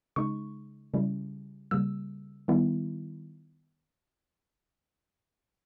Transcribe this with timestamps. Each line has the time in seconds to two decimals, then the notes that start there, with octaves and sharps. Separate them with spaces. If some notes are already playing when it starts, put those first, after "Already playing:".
0.16 C#3 G#3 D#4 C#6
0.94 C#3 G3 C#4 E4
1.71 C#3 G3 A#3 E6
2.48 D#3 G3 B3 E4